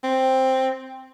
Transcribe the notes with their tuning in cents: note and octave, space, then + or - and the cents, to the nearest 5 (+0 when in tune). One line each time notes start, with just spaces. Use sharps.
C4 +5